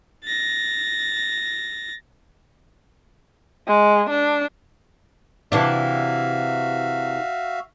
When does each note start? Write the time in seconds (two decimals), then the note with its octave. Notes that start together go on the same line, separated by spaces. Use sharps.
0.24 A6 A#6
3.67 G#3
4.10 D4
5.52 C3 E3 D4 F#4 E5 F5